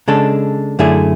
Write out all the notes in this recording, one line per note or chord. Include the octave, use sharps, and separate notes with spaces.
C#3 G#3 D4 A4
F#2 D3 A3 E4 G#4